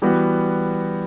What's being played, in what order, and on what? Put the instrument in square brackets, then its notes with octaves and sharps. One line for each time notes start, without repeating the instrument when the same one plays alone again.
[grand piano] E3 G3 B3 F#4